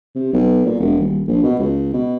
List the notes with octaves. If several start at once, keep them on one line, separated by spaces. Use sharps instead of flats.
C3
B1
A#2
E1
D#1
A#1
B2
C#2
B2